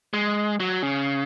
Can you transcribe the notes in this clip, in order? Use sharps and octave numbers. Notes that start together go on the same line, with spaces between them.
G#3
F#3
C#3